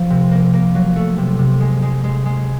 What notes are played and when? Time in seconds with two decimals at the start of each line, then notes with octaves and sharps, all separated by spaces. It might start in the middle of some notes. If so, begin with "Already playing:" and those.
Already playing: F3
0.10 C3
0.31 A#3
0.54 A#3
0.75 F#3
0.96 A3
1.18 C3
1.39 C3
1.61 G#3
1.82 G#3
2.04 G#3
2.26 G#3